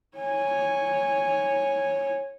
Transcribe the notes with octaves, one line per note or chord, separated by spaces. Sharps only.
C#5 G#5